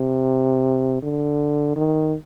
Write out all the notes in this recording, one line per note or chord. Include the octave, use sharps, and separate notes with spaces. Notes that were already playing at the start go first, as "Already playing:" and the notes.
Already playing: C3
D3
D#3